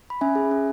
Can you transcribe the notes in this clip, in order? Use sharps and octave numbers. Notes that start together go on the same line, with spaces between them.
B5
C#4 E5 G#5
G#4
C#4